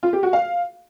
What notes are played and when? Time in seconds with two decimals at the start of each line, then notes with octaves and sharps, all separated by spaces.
0.03 F4
0.13 G4
0.23 F#4
0.33 F5